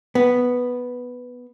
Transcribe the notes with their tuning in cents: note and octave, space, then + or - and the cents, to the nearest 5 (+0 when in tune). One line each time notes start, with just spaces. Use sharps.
B3 +0